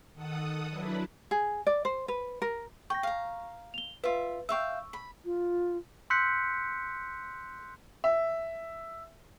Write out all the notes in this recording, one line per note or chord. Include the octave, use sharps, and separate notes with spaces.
D#3 A4 F#5 D#6
F#3 D4 E4 B4
G#4
D5
C5
B4
A#4
G5 C#6 A#6
F5 A#5
F7 G7
F4 B4 E5
E5 F5 G5 C#6 E6
B5
F4
C6 E6 F#6 G6 B6 C#7
E5